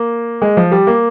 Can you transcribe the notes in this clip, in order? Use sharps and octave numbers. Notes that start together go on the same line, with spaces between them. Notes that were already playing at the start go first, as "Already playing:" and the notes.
Already playing: A#3
G#3
F3
G3
A#3